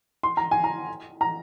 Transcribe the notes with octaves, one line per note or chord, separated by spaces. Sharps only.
C6
A#5
G#5
A#5
A#5